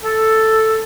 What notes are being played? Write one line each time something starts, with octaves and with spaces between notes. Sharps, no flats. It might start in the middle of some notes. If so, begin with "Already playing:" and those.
A4